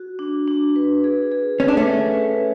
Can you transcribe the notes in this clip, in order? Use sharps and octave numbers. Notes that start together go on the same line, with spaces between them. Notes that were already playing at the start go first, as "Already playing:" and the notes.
Already playing: F#4
D4
D4
B4
G#4
G#4
C#4 C#5
D4
A3 C#4
C#5
B4